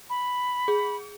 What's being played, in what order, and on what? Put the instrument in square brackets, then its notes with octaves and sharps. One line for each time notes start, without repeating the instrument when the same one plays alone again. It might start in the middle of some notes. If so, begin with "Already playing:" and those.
[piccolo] B5
[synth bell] G#4